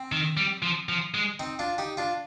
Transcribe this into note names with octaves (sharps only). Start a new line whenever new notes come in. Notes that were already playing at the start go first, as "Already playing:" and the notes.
Already playing: C4
D#3
G3
F3
F3
G#3
C4 D#4
D4 F4
D#4 G4
D4 F4